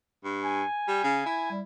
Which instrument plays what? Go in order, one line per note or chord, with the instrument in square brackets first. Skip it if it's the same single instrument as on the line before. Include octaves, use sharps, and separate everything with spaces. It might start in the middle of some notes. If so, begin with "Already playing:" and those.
[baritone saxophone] G2
[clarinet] G#5
[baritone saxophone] G3
C#3
E4
[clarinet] G3